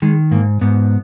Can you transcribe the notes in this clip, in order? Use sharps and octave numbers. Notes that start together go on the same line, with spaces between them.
D#3 G#3
G#2 A#3
G#2 B3